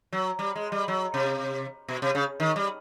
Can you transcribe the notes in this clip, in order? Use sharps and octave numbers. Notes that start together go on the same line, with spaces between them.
F#3
G3
G#3
G3
F#3
C3
B2
C3
C#3
D#3
G3